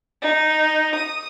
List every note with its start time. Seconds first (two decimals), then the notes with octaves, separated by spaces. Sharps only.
0.22 D#4
0.95 D#6